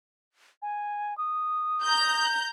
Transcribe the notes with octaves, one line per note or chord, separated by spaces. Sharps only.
G#5
D#6
A#5 G6